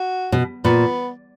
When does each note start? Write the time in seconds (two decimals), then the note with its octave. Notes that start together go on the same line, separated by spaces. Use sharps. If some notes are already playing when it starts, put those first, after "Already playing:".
Already playing: F#4
0.32 B2
0.65 A#2 B3